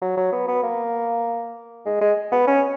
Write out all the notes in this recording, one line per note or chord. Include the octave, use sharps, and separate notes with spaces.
F#3
F#3
B3
B3
A#3
G#3
G#3
B3
C#4